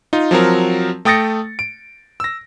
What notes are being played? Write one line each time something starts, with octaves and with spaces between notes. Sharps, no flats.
D#4 F4
F3 F#3 C4 A#4
A3 G5 D#6 A6 A#6 C#7
D7
E6 A#6